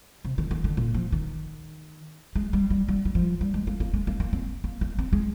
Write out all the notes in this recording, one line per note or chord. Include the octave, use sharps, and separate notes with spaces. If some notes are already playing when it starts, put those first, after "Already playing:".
C3
D#3
D#3
D3
A#2
F3
D#3
G#3
G3
G3
G3
G3
F3
G3
G#3
A#3
A#3
G#3
A#3
A#3
C4
A#3
A#3
C4
G#3